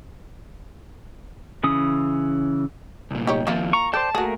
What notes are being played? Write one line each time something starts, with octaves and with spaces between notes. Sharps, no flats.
C#3 E3 C#4 D#6
C2 A#2
D#4 G4 C#5
D#2 F3 A#3 E4 F4
A#5 C#6
A4 C5 D5 G5 A5
A3 A#3 F#4 G#4 A#4